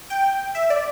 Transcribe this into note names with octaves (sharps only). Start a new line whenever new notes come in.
G5
E5
D5